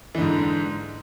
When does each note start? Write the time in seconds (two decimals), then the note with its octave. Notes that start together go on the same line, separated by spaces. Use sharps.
0.15 E3
0.18 D3
0.21 G#2